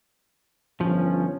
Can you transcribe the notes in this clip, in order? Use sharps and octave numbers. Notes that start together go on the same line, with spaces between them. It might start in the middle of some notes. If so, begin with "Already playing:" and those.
G1 F3 C#4